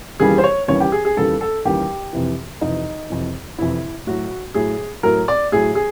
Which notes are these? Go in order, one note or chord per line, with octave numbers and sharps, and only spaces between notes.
D#2 C#3 E3 G3 G#4
C5
C#5
D#2 C#3 E3 G3 C#5
G4
G#4
G#4
D#2 C#3 E3 G3 A4
A4
D#2 C#3 E3 G3 G4
F2 C3 E3
F2 C3 E3 D#4
F2 C3 E3
F2 C3 E3 E4
A2 F#3 F#4
A2 F#3 G#4
A2 F#3 A#4
D5
A2 F#3 G#4
G#4